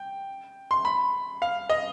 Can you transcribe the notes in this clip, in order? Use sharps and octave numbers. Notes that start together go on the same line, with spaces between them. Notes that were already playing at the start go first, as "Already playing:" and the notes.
Already playing: G5
C6
B5
F5
D#5